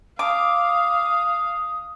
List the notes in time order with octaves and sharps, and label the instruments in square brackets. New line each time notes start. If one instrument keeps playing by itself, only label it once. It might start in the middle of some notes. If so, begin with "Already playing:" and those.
[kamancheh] F5 [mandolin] D6 [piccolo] D#6